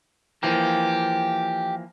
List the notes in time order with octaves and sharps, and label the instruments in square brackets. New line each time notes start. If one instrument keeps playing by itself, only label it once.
[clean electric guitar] E3 F3 A#3 [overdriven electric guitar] G4